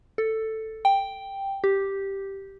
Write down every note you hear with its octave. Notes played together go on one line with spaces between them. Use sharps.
A4
G5
G4